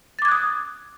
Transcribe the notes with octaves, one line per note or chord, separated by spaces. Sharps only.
D6 D#6 F#6 G#6 A6